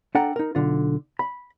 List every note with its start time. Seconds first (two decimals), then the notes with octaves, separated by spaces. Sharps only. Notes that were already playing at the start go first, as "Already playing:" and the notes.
0.15 D4 A4 F#5 G5 A#5
0.36 D#4 A#4
0.55 B1 D3 F4
1.19 B5